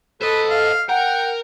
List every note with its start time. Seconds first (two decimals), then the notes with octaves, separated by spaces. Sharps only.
0.22 A4 B4 C5 D#5
0.50 F5
0.89 A#4 F#5 G5